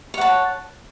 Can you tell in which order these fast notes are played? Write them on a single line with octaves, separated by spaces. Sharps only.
C#5 F#5 A5